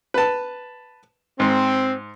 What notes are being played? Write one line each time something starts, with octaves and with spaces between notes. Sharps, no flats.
B4 A5
G#2 C4